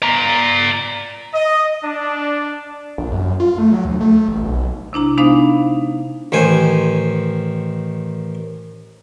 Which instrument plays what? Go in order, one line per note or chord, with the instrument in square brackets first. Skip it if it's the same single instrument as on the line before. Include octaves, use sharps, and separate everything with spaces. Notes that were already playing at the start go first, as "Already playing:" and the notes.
[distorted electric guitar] D5 A#5
[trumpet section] D#5
D4
[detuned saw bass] A#1
F#2
F4
A3
F#3
D2
A3
A1
B1
[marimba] C3 D4 E4 A#5
G#3 B3 D4 D#4 C5 F5
[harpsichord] A1 D#3 C5 G#5